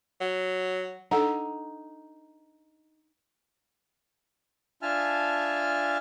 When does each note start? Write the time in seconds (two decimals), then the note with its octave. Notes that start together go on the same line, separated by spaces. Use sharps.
0.21 F#3
1.11 D4 D#4 A4 F#5
4.82 D4 F4 E5 G#5 A5 F6